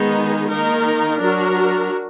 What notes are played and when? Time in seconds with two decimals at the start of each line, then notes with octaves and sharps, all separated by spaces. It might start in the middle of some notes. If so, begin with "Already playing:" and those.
Already playing: D#3 G#3 B3 D#4 G#4
0.50 D#3 A#3 D#4 A#4
1.20 F#3 D4 F#4 A#4